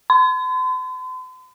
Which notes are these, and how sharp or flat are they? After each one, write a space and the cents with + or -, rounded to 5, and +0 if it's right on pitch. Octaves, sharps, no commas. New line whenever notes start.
C6 -45